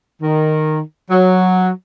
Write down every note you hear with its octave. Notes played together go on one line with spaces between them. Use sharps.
D#3
F#3